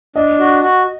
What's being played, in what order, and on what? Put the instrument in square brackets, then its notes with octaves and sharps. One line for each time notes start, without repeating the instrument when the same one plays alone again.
[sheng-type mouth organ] D4 [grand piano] D#5
[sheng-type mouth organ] F#4
F#4